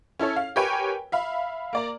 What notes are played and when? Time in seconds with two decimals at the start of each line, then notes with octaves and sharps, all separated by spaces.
0.19 C#4 E4 A4 C#5
0.36 F5
0.56 G4 A#4 B4 C#5 G5 G#5
1.12 E5 F5 B5
1.73 A#3 D5 A#5